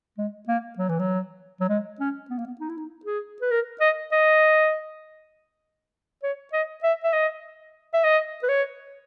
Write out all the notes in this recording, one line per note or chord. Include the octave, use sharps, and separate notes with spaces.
G#3
A#3
F#3
E3
F#3
F#3
G#3
C#4
B3
A#3
B3
D#4
E4
D#4
G#4
B4
A#4
D#5
D#5
C#5
D#5
E5
E5
D#5
E5
D#5
B4
C#5